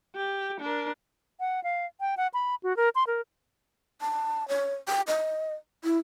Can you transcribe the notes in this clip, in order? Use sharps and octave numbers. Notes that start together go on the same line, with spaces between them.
G4
D4 A#4
F#5
F5
G5
F#5
B5
F#4
A#4
C6
A#4
A5
C#5
G5
D#5
E4